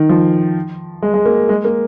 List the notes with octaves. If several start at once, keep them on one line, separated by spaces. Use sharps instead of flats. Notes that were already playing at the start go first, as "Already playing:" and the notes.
Already playing: D#3
F3
G#3
G#3
A#3
G#3
A#3